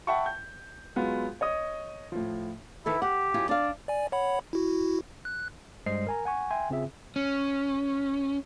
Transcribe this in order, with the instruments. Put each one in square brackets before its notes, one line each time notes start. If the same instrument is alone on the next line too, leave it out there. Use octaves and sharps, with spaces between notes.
[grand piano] E5 F#5 G5 A5 B5 C#6
G6
F#3 G#3 B3 F4
C#5 D#5 D#6
A2 F3
[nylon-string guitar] D#3 E3 A4 [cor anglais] E4
[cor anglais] G4 [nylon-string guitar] F#5
[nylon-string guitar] F#2 E4 F4
[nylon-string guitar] D4 F5 [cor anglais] D5
[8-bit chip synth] D5 G#5
C#5 F#5 B5
E4 F#4
F#6
[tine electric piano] G2 G3 G#3 C5 D#5 C7
A#4 G#5 A#5
F#5 G#5 C#6
E5 G5 G#5 C6
C#3 C4 F4 G#4 E5
[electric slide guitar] C#4